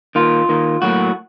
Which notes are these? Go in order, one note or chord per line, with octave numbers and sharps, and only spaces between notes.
D#3 A#3 F4
D#3 A#3
A2 F#3 A#3 F#4